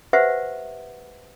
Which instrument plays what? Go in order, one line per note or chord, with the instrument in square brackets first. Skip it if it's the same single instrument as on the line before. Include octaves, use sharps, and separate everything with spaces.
[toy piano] G4 B4 C5 E5 F#5